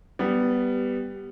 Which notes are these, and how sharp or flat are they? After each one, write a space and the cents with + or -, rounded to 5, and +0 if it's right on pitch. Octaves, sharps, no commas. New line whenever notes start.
G3 +0 B3 +5